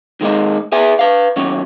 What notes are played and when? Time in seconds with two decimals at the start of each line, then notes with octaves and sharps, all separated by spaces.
0.21 D#3 G#3 A#3 D#4
0.72 G#4 B4 E5 G#5
0.99 B4 F5
1.36 D#2 F#3 C#4